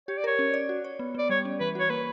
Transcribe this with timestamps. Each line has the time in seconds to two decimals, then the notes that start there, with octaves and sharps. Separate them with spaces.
0.08 G4 C#5
0.17 D5
0.24 A#4 C#5
0.39 C#4
0.54 D5
0.69 F#4
0.84 C#5
0.99 B3
1.15 B3 D5
1.29 G3 C#5
1.45 C#4
1.60 E3 B4
1.75 F#4 C#5
1.90 A#3 B4